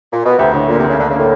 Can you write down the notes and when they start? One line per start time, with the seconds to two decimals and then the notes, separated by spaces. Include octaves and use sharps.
0.12 A#2
0.25 B2
0.38 D2 C3
0.54 A2 D3
0.68 A#2 A#3
0.79 C3
0.84 D2 C#3
0.99 D2 D3
1.09 C#3 A#3
1.19 A2